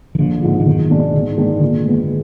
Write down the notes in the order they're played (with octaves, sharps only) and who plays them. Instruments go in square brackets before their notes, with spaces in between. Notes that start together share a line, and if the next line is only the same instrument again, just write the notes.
[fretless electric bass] D#3
[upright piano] A#1 [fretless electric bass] D3
[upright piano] G#2 F3
[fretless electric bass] D3
[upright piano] B1 [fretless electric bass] D#3
[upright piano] B2 G#3 D4 G#4
[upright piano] G#2 [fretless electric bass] D3
[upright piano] D#3 G#3 B3 D4
[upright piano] A#2 [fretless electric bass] D3
[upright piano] G#3 B3